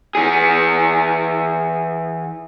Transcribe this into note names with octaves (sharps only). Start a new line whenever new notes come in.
E3 G#4